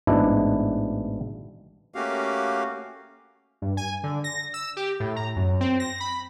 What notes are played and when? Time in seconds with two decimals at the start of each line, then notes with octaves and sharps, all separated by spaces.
0.07 A1 G#2 B2 D4 E4
1.95 A3 A#3 C#4 F#4 G4 F5
3.62 G2
3.77 G#5
4.04 D3
4.24 A#6
4.54 E6
4.77 G4
5.00 A2
5.16 A#5
5.36 F#2
5.61 C4
5.80 A#6
6.00 B5